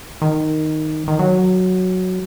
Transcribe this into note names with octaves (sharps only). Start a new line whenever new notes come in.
D#3
D#3
F#3